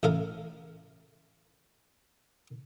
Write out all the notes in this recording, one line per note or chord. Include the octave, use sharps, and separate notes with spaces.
A1 C#3 A4 A#4 F5